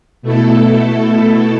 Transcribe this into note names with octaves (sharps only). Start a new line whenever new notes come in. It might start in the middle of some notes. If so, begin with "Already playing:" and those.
B2 A3 E4 A4